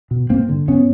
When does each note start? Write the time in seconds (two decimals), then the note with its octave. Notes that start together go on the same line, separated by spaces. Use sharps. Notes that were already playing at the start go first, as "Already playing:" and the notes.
0.11 B2
0.30 G2 A#3 C4
0.49 D3
0.68 G2 B3 C#4